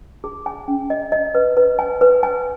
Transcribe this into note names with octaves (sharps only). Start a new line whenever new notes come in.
G#4
G#5
C#4
D#5
D#5
B4
B4
G#5
B4
G#5